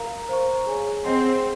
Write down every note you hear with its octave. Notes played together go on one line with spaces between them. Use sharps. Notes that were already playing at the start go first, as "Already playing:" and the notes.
Already playing: A#4 F5 A#5
C5 F5 A#5 C#6
G#4 C#5 G#5
C4 G#4 C5 D#5 F#5 C6